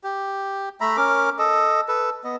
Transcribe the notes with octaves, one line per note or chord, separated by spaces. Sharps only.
G4
A3 E5 A#5 B5
C#4 A#4 D6
A4 D#5
A4 B4
B3 D#5